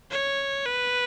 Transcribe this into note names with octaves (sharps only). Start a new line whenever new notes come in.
C#5
B4